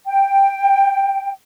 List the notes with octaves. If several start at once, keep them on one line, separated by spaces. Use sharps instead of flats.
G5